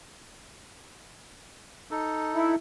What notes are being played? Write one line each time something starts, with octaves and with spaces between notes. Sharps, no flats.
D#4 A4
E4